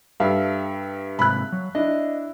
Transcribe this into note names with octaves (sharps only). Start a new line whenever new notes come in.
G2 A4 E5 F5
G#2 C3 B5 F#6
F#3
D4 E4 D#5